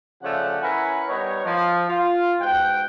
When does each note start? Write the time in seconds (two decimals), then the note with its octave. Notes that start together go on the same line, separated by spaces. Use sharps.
0.23 C#3 F3 A3 C#4 D5 F#5
0.62 C#4 E4 A#4 B4 F#5 G#5
1.08 G3 B3 D#4 A#4 C#5
1.45 F3
1.89 F4
2.41 G#2 B2 F#5 G5